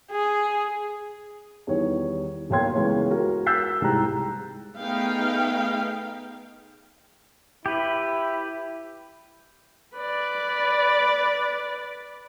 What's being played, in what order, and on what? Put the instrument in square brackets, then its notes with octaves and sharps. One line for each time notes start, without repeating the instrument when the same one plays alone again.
[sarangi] G#4
[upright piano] E2 D#3 G3 C#5
B1 A#3 C#5 G5 C6 G#6
C#2 E3 B3 C#5
F#4 A#4
E6 F#6 G6 A6 B6 C7
C2 G#2 G4 A#5 F#6
[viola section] A3 B3 D#4 G#4 F5 G5
[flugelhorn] E4 [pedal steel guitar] G4 B4
[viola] B4 D5